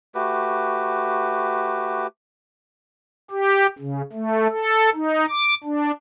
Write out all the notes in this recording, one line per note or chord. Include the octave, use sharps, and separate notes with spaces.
A3 F#4 G4 B4
G4
C#3
A3
A4
D#4
D6
D4